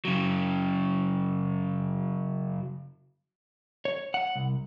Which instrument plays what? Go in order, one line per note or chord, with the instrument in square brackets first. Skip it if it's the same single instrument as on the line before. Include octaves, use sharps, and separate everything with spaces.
[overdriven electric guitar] C#3 F#3
[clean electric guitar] C#5
F#5
C2